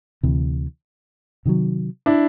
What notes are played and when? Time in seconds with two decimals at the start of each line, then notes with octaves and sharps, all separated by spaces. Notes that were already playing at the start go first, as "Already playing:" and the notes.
0.23 D2 C3 E3
1.45 C3 D#3 F#3
2.06 D4 E4